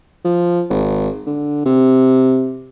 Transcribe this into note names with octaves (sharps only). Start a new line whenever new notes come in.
F3
G#1
D3
C3